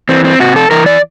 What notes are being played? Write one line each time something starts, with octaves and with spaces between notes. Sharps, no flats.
E3 C4
C4
C3 F#4
A4
E3 A#4
D5